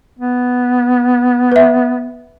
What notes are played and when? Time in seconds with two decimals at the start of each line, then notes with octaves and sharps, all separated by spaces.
0.19 B3
1.52 B4 E5